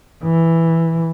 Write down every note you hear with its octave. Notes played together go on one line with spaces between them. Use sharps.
E3